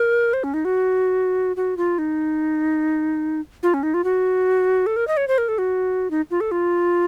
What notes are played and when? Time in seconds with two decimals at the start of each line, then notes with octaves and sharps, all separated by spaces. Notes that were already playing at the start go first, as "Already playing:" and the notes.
Already playing: A#4
0.33 C5
0.44 C#4
0.54 D#4
0.65 F#4
1.56 F#4
1.77 F4
1.98 D#4
3.63 F4
3.74 C#4
3.83 D#4
3.94 F4
4.04 F#4
4.86 A4
4.96 A#4
5.08 D#5
5.17 C#5
5.28 C5
5.38 A#4
5.48 A4
5.58 F#4
6.11 D#4
6.31 F4
6.41 A4
6.51 F4